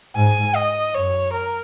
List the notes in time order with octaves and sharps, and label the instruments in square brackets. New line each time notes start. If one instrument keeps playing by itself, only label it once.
[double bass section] G#2 [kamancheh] G#5
[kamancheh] D#5
[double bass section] F#2 [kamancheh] C#5
[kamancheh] A#4